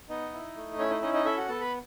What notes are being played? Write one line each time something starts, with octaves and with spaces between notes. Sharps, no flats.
B3 D#4 D#5
E4
A3
C#4 E4 C#5
D#4 D#5
C#4 D#4 D#5
D#4 D#5
E4 A4 E5
F#4 F#5
B3 A4 A5
B4 B5